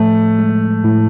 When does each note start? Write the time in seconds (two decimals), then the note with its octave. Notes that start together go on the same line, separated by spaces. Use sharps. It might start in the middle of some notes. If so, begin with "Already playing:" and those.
Already playing: A2 F3 A3
0.39 G#3
0.84 A2